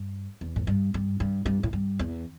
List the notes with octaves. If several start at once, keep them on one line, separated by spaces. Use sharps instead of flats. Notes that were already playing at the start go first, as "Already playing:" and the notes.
Already playing: G2
E2
A2
G2
G2
G2
G2
A2
G2
E2